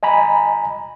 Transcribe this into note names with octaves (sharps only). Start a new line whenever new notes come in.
D#5 G#5 A#5 B5